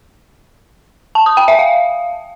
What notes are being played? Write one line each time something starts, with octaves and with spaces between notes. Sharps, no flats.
A5
D#6
G5
E5
F5